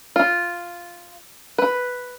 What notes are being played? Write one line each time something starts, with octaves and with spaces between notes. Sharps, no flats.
F4
B4